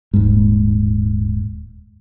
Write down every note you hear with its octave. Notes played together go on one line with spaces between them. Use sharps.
D#1 G#2